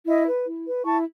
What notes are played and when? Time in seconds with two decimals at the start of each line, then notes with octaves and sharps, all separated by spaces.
0.07 E4 D#5
0.27 B4
0.46 E4
0.67 B4
0.85 E4 A5 C#6